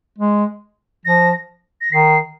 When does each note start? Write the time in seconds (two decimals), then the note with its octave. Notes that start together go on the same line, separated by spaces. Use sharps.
0.18 G#3
1.05 F3 A#6
1.81 A#6
1.92 D#3 C7